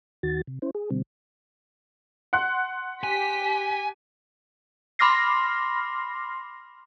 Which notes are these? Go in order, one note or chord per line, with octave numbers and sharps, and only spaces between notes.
D#2 D#3 F#4 A6
C3
C#4 E4 C5
G#4
B2 D3 G3 C4
F#5 C6 F#6
G4 G#5 B6
B5 C6 D6 F6 A#6 C7